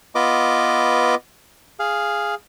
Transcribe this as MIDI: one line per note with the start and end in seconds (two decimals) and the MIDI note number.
0.15 1.15 59
0.15 1.15 65
0.15 1.15 71
0.15 1.15 75
0.15 1.15 86
1.80 2.35 68
1.80 2.35 77